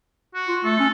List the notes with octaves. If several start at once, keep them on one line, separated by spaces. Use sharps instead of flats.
F#4
F4
A3 A4
C#4